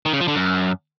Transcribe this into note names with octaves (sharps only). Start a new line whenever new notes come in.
D#3
C#3
F3
D3
F#2